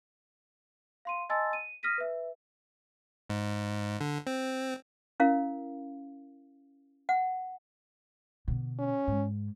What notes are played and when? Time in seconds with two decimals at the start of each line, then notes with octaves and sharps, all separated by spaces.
1.05 F5 C6 D#7
1.29 D#5 G#5 A5 C6 E6 A6
1.53 D#7
1.83 D#6 F6 A#6 B6 D#7
1.98 B4 E5
3.30 G#2
4.01 D3
4.27 C4
5.20 C#4 E4 A#4 F5
7.09 F#5
8.48 B2 D3
8.79 C#4
9.07 G#2